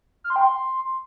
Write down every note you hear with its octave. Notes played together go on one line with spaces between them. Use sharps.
F6
C6
G5
C6